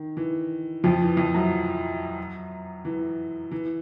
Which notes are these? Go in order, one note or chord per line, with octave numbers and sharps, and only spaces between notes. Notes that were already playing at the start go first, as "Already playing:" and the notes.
Already playing: D#3
E3
F2 F3
E3
F2 F3
F#2 F#3
E3
E3